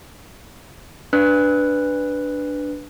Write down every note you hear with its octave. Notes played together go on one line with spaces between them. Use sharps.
D4 B4 F#6